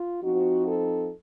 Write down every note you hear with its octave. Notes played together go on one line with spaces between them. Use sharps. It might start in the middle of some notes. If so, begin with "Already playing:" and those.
Already playing: F4
F3 C4 D#4 F#4
A4